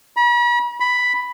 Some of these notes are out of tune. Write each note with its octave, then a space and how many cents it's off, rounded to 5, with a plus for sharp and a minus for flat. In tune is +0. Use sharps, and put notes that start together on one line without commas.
B5 -45
B5 +5